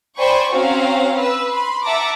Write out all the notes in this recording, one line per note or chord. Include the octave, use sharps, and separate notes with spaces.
C5 D5 G5 G#5 B5 C#6
C4 C#4 F#4 F5 A#5
B4 E6
B5 C6
E5 F#5 A5 A#5 D6